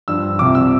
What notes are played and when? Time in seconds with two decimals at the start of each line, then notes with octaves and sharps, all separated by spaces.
0.08 G2 F3 E6
0.39 C2 C3 F3 D6
0.55 E6